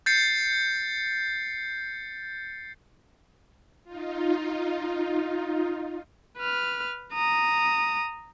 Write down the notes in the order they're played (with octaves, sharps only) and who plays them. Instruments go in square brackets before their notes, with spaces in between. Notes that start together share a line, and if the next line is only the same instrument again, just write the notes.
[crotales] G6 A6 C7 C#7
[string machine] D#4 F4
[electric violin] B4 F6
A#5 D#6